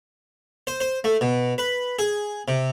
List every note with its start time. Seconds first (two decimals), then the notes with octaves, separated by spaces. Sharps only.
0.67 C5
0.81 C5
1.04 A3
1.21 B2
1.58 B4
1.99 G#4
2.48 C3